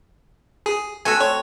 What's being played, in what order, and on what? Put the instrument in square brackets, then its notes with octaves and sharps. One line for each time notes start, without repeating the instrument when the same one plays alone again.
[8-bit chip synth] G#4
[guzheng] A3 C4 F#4 [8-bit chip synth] G#5 E6
[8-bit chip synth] C#5